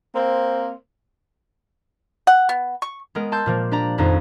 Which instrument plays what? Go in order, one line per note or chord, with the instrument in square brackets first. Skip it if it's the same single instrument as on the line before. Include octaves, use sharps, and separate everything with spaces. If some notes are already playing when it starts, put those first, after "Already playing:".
[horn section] A#3 C4
[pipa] F#5
B3
C#6
[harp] G#3 B3 A#4
A5 C6 E6 G6
A#2 F3 A#3
D4 G4 D5 A#5
G#1 F2 D#4 A#5